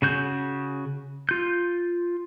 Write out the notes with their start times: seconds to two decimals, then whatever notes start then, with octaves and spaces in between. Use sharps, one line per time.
0.02 C#3 F#4 G6
1.29 F4 G6